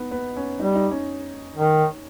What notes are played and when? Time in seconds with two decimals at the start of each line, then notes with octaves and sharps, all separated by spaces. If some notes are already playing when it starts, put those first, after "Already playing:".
Already playing: B3 D#4
0.11 B3
0.37 C#4
0.59 G3 D#4
0.75 D#4
0.91 C#4
1.56 D#3